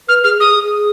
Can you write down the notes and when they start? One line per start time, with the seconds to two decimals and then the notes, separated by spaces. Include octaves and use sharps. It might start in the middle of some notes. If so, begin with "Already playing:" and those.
0.08 B4 F6
0.24 G#4 F6
0.39 G#4 D#6
0.55 G#4